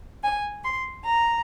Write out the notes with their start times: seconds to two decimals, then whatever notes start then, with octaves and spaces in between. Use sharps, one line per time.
0.22 G#5
0.63 C6
1.03 A#5